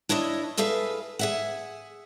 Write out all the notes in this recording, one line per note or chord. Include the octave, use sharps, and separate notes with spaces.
D4 E4 C#5 D#5 E5
G#4 A4 B4 E5 F5
G#4 E5 F#5